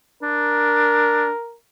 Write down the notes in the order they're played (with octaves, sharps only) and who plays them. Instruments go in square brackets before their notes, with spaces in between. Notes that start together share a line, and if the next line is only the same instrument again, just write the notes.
[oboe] D4 [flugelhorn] A#4